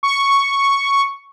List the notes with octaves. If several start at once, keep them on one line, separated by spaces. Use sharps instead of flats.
C#6